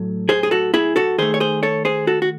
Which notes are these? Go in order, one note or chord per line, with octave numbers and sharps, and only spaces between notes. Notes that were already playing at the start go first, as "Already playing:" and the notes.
Already playing: A2 F#3 A3
G#4 C5
G#4
F#4 A4
E4 G#4
F#4 A4
D#3 A3 G#4 C5
C#5
G#4 C5
A4 C#5
G#4 C5
F#4 A4
F#4